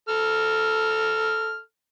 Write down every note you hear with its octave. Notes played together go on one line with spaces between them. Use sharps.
A4 F6